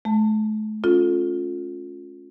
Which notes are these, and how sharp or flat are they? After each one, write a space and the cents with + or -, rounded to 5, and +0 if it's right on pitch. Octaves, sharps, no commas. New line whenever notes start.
A3 -40 A5 +30
C#4 +0 F4 +20 A4 +0